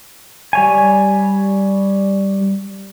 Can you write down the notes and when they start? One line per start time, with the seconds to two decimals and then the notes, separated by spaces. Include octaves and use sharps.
0.53 G3 C#5 G#5